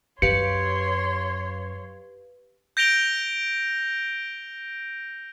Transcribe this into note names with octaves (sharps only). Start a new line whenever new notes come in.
F#2 G4 B4 C#5 F5 C6 C#7
G6 A#6 D7 F7 G7